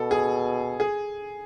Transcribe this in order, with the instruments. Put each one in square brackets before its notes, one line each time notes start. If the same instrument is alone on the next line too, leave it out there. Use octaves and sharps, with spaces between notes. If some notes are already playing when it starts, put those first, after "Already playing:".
Already playing: [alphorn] B2 [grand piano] A4
[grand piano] G#4
G#4